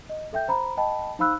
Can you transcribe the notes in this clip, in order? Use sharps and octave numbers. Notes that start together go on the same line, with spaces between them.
D#5
A4 E5 G5 G6
C5 A#5 B5
D#5 G5 A5 B5
D#4 C5 F5 B5 E6 F#6